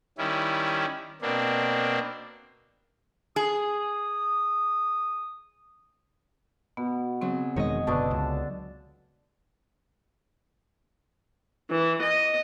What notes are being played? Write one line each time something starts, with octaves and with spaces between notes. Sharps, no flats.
D#3 G3 C#4 E4
B2 A#3 C4 D4
G#4 D#6
B2 B3
C#3 F#3 C4
E1 D#3 G#3 C#5 D#5
F#1 B2 D3 D4 B4 A5 C#6 D#6
C#2
E3
D#5